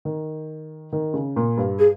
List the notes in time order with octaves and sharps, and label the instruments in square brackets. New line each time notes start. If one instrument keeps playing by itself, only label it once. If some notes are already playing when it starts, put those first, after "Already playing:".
[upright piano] D#3
D#3
C#3
A#2
G2
[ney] G#4